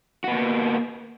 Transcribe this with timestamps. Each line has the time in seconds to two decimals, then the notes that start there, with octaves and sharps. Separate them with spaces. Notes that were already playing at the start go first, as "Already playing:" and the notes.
0.24 F#4
0.28 B3
0.31 A#3